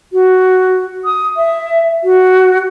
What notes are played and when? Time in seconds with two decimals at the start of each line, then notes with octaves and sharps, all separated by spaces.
0.13 F#4
1.05 D#6
1.37 E5
2.04 F#4